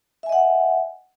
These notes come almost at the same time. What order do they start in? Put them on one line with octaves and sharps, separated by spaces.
E5 G#5 D#5 F#5